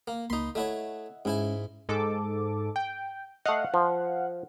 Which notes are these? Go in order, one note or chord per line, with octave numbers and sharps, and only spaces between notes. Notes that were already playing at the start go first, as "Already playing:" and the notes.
A#3
C#2 A#3 D#4 B5 C6
A3 E4 C#5 D#5 E5 F#5
G#2 G#3 C#4 E4 G#4 G#5
G#2 A4 D6
G5
A3 D#5 F5 F#5
F3